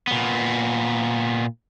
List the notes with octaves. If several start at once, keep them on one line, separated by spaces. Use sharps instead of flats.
A#2 B3